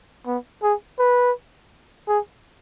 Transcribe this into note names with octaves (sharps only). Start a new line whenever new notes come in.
B3
G#4
B4
G#4